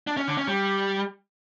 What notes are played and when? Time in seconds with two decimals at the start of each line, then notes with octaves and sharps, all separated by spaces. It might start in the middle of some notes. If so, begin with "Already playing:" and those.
0.07 D4
0.17 C#4
0.27 D3
0.37 C#4
0.47 G3